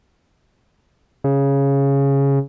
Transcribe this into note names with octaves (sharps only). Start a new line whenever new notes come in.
C#3